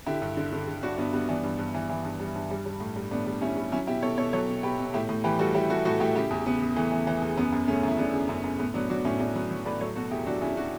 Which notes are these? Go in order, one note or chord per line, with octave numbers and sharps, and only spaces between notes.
D3 E4 G4
G2
D3
D3
D3
G2 D4 F#4
G2 B3 D4
G3 B3 D4
E3 B3 D4
G2
G2
E3
E3
G2
G3
G2
G3
G3
A2
G3
A2 B3 D4
G3
G3 C#4 E4
G3
F#3 C#4 E4
B2 E4 G4
B2 A4 C#5
B2 A4 C#5
F#3 A4 C#5
B2
B2 G4 B4
B2
A2 E4 G4
A2
E3 G4 B4
G3 F#4 A4
G3 E4 G4
G3 F#4 A4
A2 F#4 A4
A2 E4 G4
C#3 E4 G4
E2
C#3 B3
C#3
E3 A3
E3
E3
E2
F#2 B3
F#2
C#3 A3 C#4
F#2 E4
C#3 B3 D4
C#3
F#2
F#2
A2 B3
F#3 B3 D4
F#3 D4 F#4
A2 C#4 E4
A2 B3 D4
F#3 B3
F#3
A2 B4 D5
F#3 A4 C#5
B2 F#4 A4
E2 E4 G4
F#3 D4 F#4
E2 C#4 E4
D4 F#4